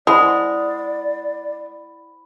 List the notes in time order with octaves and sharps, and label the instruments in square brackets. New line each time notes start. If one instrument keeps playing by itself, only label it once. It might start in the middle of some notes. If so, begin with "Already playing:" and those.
[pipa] G#3 [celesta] E4 C5 F#5 [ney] D5 [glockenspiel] B5